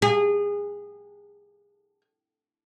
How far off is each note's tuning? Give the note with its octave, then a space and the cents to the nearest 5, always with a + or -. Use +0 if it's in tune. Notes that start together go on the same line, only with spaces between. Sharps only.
G#4 -25